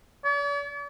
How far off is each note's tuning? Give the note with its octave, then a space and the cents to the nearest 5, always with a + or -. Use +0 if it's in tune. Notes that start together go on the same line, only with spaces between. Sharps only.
D5 -45